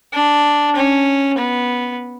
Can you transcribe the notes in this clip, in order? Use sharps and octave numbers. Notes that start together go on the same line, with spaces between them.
D4
C#4
B3